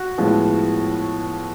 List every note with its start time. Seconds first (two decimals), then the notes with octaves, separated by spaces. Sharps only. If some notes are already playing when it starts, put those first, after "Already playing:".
Already playing: F#4
0.18 A2 F3 G#3 B3